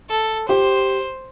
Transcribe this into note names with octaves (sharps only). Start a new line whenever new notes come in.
A4
G4 C5